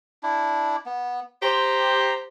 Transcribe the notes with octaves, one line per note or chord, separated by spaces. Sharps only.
D4 E4
B3
G4 C5 A#5